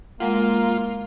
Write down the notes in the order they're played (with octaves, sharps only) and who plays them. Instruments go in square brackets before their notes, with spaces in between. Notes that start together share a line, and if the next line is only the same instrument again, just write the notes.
[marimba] G#3 F#5 [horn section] A#3 [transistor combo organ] F4